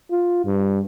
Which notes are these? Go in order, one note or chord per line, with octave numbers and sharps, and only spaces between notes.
F4
G2